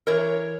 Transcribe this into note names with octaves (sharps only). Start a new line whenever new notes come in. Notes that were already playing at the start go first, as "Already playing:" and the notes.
E3 A#4 C#5